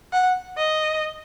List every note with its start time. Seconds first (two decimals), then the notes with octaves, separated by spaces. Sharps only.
0.13 F#5
0.57 D#5